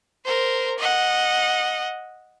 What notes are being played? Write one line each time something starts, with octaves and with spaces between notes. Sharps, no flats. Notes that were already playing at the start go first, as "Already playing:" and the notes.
A#4 C5
D#5 F#5